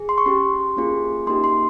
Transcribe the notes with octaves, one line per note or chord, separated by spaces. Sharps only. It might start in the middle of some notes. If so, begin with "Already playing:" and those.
Already playing: G#4
C6
C#6
C#4 G4 C6
A#3 C#4 F4 G#4
A#3 D#4 G4 C6
C6